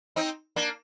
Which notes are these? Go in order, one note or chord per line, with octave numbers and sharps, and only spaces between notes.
C4 D#4
A#3 D4